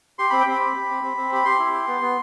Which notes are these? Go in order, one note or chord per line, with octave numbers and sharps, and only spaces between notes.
G4 C6
C4 B5
G5
C4 B5
G4
G4
C4
C4
C4
G4 B5
G4 C6
E4
G4
B3
B3